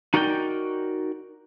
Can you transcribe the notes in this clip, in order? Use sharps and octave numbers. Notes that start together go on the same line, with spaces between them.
D#4 F#4 A#4 D5 F#5 G5